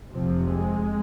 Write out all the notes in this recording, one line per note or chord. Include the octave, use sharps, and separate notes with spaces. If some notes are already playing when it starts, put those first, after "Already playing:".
F1 F2 C3 F3
G#3